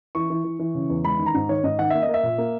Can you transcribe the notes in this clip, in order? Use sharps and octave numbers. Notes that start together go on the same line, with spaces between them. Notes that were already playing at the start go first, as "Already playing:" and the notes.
E3 C#6
E3
E3
E3
C#3
E2
G#3 B5
D#3
A#5
G#2
D#3 C#5
G#2 D#5
D#3 F#5
A#3 E5
D#5
A#3
E5
A#2
A#3